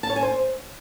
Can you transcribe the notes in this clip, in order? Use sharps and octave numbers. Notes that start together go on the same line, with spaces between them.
A5
C#5
G#5
C5